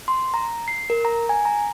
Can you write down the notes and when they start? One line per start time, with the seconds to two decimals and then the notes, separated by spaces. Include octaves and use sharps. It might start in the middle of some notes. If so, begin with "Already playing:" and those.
0.08 C6
0.34 A#5
0.68 C7
0.90 A#4
1.05 A#5
1.29 G#5
1.45 A#5